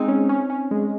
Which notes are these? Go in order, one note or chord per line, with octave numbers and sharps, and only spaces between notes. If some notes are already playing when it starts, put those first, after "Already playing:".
Already playing: G#3 C4 D#4
C#4
C#4
C#4
G#3